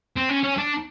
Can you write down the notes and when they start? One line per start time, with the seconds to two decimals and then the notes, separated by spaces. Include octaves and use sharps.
0.17 C4
0.30 C#4
0.44 C#4
0.58 D4